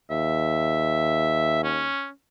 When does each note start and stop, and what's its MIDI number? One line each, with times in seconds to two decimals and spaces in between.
0.11 1.90 39
0.11 1.62 76
1.64 2.10 61